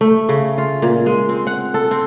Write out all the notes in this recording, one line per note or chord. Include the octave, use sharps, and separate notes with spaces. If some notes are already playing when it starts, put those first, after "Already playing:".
A3
C#3
F4
A#2
G#3
C4
F#5
A4
C4